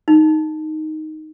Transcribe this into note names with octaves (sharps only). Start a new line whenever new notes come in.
D#4